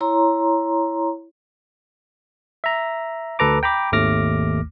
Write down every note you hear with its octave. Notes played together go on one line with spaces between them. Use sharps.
E4 C#5 A#5 C6
E5 A#5
D2 A4 B4 A#5 D6
G5 A#5 B5 D6
G#1 D#2 A3 D6 F6 A#6